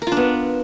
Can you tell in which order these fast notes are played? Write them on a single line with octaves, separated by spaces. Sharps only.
A#4 F4 D4 B3